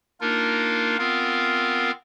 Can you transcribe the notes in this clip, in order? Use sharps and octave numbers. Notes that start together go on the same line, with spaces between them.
A#3 D4 D#4 F4 A#4
B3 C4 F4 A#4 F5